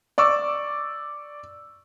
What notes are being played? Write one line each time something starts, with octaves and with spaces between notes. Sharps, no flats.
D5 C#6 D6 E6